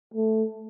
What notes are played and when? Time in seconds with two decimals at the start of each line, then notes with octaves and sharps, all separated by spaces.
0.14 A3